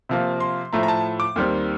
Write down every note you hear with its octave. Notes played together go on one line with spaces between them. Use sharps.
C3 F3 A#3
C6
A2 F3 A3 A#5
A#5
A5
D6
D#2 D#3 G3 C4